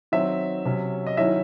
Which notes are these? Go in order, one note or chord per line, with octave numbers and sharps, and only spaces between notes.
D#3 F#3 C4 E5
C3 F#3 C#4
D#5
D#3 F#3 C#4 E4 E5